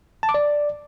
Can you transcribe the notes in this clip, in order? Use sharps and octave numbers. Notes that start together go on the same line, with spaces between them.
A5
D6
D5